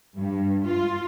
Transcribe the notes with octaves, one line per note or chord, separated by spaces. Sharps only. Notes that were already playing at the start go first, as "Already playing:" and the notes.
G2
F4